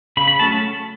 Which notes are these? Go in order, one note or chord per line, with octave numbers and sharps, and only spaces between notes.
C#3 B5
B5
F#3 A3 C#4 A5